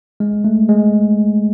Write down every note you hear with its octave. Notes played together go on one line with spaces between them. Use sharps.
G#3
A3
G#3